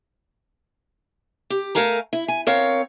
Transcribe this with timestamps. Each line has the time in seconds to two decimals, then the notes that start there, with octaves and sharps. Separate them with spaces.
1.50 G4
1.75 A3 A#4 F5 G#5 A#5
2.13 E4
2.28 G#5
2.47 C4 A#4 C#5 F5